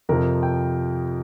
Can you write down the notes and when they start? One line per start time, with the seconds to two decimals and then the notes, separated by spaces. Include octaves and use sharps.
0.09 F2 C3 F3 A#4
0.43 G5